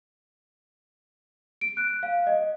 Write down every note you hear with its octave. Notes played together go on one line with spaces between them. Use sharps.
D7
F#6
F5
D#5